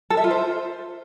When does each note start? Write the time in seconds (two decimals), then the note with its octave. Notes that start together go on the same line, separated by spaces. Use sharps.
0.10 A4
0.17 E5
0.24 F4
0.31 C5